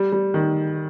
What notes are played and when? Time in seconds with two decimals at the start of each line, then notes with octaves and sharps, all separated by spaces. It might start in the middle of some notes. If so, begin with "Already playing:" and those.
Already playing: G3
0.12 G3
0.34 D#3